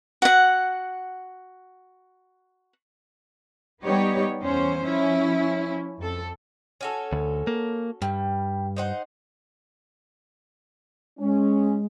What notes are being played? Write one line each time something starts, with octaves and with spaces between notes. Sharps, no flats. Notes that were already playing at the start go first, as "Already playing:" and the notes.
F#4 F#5
G3 B3 D#4 G4 C#5
E2 C#4 C5
F3 C#4 E4
F2 A4
C#4 F#4 A4
D2
A#3
G2 G3
D#4 C5 F#5
G#3 C#4